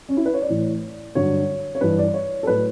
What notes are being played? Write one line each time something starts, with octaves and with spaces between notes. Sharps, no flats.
C#4
E4
B4
C#5
D5
A2 E3
G2 D3 F#3 C#5
C#5
G2 E3 B4
D5
C#5
A4
A2 F#3 B4